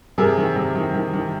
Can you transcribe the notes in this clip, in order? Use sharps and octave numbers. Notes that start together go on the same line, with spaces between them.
C3 G#4 A#4
D#3
C3
D#3
D#3
D#3